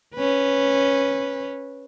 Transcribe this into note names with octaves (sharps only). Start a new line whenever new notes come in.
C#4 B4